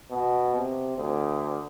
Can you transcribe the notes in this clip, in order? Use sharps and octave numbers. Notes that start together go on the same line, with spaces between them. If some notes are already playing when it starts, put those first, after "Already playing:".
B2
C3
D2